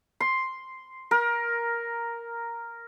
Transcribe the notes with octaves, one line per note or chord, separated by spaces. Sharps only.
C6
A#4